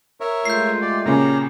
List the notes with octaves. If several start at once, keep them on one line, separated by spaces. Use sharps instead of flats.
A#4 C#5 E5
G#3 A3 F4 G6 C7
G4 D5
A#2 C#3 C#4 G4 A#5